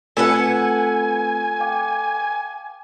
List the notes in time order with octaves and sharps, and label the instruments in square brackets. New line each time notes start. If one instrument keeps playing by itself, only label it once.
[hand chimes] A3 C4 F4 [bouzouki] A4 B4 F#5 [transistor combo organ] G#5
[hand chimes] F5 G5 D6